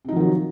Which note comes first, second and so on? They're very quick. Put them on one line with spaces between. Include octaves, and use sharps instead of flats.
C3 D#4 F3 D#3 F#3